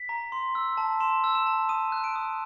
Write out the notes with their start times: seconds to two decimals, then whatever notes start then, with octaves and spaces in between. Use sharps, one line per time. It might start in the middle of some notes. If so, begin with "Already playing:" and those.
Already playing: B6
0.09 A#5
0.32 C6
0.55 E6
0.77 A5
1.00 C6 E7
1.24 E6
1.35 E7
1.46 A5
1.69 D#6 D#7
1.92 F#6
2.04 D7
2.15 D#6